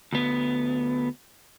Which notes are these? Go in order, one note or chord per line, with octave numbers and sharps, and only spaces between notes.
D2 B3